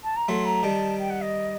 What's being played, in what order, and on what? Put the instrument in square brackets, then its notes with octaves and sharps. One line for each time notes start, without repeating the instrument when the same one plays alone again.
[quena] A5
A#5
[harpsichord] F#3 A3 [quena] C6
[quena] A#5
[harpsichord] D#3 G3 [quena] A5
[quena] G5
F#5
D#5